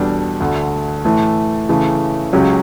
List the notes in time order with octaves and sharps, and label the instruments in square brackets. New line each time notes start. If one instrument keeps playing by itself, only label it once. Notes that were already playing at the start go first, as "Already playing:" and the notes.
Already playing: [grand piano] E2 B2 G3 D4 A4
D2 D3 A3
A2 E3 A3
C#3 E3 A3
C#2 C#3 F#3 C#4 G4